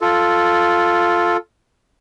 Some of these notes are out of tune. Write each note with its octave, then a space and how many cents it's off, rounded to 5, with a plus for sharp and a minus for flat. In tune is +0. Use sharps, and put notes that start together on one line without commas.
F4 +0 A4 +0